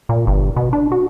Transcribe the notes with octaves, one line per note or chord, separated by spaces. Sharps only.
A#2
G1
B2
D4
F#4